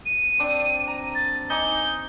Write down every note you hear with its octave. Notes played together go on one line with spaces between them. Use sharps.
D#7
C4 D4
A#5
A6
D#4 G#5 D6 G7